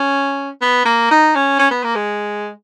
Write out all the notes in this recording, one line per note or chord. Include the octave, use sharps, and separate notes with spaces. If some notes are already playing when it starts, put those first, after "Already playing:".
Already playing: C#4
B3
A#3
D#4
C#4
C#4
B3
A#3
G#3